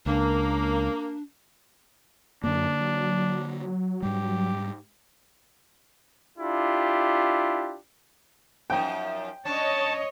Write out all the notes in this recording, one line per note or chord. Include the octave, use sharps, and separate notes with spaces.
C#2 A#3 D4
F#2 D3 A#3 D4
F#3
G#2 G3 G4
D4 E4 F4 G4
F#2 F3 D#4 G5
C#4 D4 C#5 D#5 A5